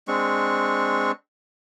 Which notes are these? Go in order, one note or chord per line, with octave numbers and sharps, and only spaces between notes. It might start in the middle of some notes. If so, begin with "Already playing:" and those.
G#3 C4 D4 C#6